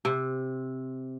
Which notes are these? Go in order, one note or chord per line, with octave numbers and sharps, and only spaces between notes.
C3